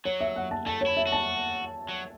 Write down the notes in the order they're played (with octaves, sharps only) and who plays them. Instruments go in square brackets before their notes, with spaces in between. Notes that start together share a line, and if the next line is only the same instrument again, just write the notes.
[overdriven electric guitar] F#3 [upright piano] C#5
[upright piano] E5
F#5
A5
[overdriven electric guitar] A3 [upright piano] A5
[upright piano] C#5
[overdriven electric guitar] E4
[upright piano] E5
[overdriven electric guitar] F#4
[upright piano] A5
[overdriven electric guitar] F#3